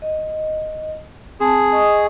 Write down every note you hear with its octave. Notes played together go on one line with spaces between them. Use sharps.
D#5
C4 G#4 A5
D#5 C#6 D#6